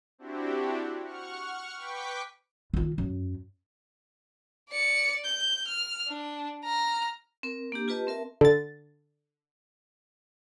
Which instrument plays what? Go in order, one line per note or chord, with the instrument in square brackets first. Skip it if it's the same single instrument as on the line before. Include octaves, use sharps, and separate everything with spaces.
[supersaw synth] C4 D4 E4 F#4 G4
F#5 C#6 F6
B4 G5 C#6 D6 B6
[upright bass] D#3 F4
F#2
[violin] D5 C#7
G6
F6
D4
A#5 F6
[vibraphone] C4 A#4
A#3 D4 G4
F4 G4 B4 D#5 A5
C4 A#4 E5 A5
[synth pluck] D3 A6